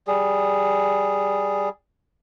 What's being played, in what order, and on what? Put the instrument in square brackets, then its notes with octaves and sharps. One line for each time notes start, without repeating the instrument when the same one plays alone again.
[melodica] G3 G#4